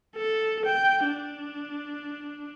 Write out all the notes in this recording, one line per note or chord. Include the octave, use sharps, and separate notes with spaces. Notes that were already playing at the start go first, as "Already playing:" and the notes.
A4
G5
D4